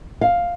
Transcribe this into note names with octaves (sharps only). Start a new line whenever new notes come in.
F5